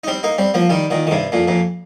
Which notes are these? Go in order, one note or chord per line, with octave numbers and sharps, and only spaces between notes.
D#4
G3 C4
A#3 D#4
G3 C4
F3 A#3
D#3 G3
A#2 D#3
D#3
G2 C3
F2 A#2
F2 A#2